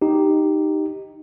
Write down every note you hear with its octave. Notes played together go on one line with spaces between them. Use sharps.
D#4 G4